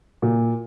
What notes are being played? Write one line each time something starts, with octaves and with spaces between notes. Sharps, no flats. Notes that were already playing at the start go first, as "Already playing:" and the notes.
A#2